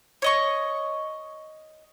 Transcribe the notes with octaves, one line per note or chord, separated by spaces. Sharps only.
C#5 D#5 C#6